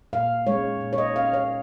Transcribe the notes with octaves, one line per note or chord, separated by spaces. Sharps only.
A#2 F5
G#3 C#5
C#4
A#2
C#5
D#5
G#3 C#4 F5
C#5